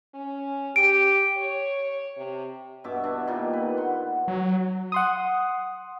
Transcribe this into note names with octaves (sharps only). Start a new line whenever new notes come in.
C#4
G4 D7
C#5
C3
G2 B2 E5 D6
D4 E4
A#2 D#3 G3 A#3
B4
F#5 C6
F#3
F#5 C6 D#6